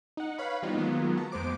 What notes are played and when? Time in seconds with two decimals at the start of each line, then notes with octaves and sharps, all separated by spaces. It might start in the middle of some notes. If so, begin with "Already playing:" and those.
0.17 D#4 F#5
0.38 B4 C#5 F5 B5
0.62 E3 G3 B3 C4 D#4 F4
0.75 D#3 F#3 G#3 A#3 B3 F4
1.17 F#4 A5 A#5
1.31 F2 G#3 B3 C5 D6 D7